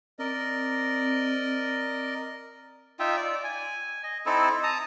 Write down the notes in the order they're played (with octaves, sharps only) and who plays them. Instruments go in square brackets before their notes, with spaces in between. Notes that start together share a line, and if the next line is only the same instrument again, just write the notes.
[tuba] C4 [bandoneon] A#4 D5 D#5
[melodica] D#4 F4 E5 G5
D5
G#5
D#5
C4 D#4 E4 A4
A5 A#5 D#6